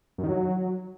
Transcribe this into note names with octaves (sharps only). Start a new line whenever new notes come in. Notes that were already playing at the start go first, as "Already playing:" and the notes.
F#2
D#3
F#3